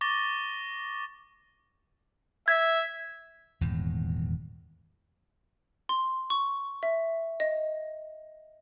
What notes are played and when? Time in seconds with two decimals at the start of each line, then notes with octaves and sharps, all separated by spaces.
0.01 C#6 D6 A6 A#6 G7
2.48 E5 G#6
3.61 D#1 E2 G#2
5.89 C6
6.30 C#6
6.83 E5
7.40 D#5